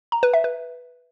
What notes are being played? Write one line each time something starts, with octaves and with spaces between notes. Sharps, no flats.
A#5
B4
E5
B4